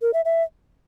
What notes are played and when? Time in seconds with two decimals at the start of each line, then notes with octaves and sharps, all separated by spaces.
0.02 A#4
0.14 E5
0.25 E5